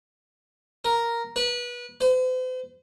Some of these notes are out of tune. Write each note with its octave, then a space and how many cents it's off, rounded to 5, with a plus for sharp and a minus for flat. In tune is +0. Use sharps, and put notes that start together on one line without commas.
A#4 +0
B4 -25
C5 -45